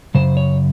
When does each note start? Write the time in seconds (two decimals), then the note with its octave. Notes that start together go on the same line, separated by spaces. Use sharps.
0.14 F#2 C#3 C5
0.37 C#5